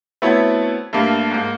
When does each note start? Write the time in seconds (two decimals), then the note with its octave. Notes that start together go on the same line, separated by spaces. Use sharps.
0.22 A3 B3 C4 E4 F#4 C#5
0.93 G2 A3 A#3
1.31 G#2 A#3